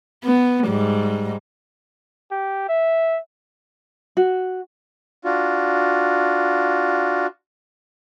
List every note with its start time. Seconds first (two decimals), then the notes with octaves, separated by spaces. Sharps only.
0.24 B3
0.66 G#2 G3
2.31 G4
2.69 E5
4.17 F#4
5.24 D4 F4 F#4